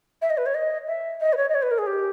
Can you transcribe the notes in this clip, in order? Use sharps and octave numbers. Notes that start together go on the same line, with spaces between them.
E5
D#5
B4
C#5
D#5
E5
D#5
B4
C#5
D#5
C#5
B4
A#4
G#4
G4